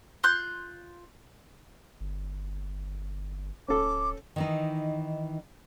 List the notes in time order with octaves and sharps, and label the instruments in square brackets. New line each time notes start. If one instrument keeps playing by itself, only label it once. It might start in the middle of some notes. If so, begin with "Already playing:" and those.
[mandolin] F4 C6 F#6 G6
[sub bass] G1
[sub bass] D1 [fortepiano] C#4 A4 [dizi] D6
[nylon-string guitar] D#3 E3 D#4